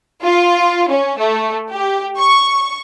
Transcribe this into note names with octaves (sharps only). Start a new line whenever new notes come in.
F4
C#4
A3
G4
C#6